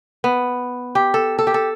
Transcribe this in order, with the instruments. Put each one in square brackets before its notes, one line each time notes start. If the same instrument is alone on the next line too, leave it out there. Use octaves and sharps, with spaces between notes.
[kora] B3
G4
A4
A4
G4
A4